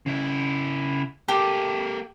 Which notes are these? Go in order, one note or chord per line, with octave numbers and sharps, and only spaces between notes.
C#3 E4
A#3 G4 A4